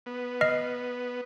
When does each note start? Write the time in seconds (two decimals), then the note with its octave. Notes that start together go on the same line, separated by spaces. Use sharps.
0.06 B3
0.41 D#5 F6 C7